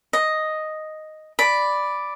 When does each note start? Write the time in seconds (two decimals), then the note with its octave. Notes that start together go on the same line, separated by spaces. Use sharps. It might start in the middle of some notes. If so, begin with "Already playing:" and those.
0.13 D#5
1.39 D5 B5